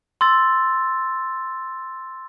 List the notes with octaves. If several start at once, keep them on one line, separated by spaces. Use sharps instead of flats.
C6 E6 A6